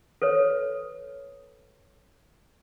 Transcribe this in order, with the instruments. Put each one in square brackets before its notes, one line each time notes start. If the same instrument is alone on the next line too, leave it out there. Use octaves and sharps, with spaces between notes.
[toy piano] A4 B4 C#5